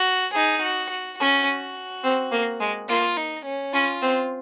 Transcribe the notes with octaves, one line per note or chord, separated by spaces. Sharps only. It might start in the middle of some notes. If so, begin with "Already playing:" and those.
Already playing: F#4
D#4 G#4
F#4
F#4
C#4 F#4
C4
A#3
G#3
A#3 F4
D#4
C#4
C#4 F4
C4